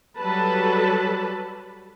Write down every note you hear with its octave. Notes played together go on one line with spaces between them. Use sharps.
F#3 G3 A4 B4 A5 B5